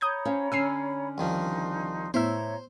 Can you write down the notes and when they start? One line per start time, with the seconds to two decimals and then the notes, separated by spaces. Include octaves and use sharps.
0.01 C#5 A#5 B5 D#6 G6 G#6
0.25 C#4 C5 F5
0.52 D3 C#4 G#5 E6 F6 C7
1.18 C2 D#3 F3 D#4 C6
2.14 A2 B3 E4 C5 C#5 E5 A#5 E6